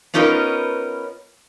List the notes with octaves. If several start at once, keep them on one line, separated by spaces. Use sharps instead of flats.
B3 C#4 D#4 F4 A#4 B4